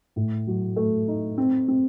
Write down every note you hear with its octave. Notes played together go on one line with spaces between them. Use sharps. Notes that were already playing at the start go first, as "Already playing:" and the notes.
A2
F#3
A3
D#4
C4
C4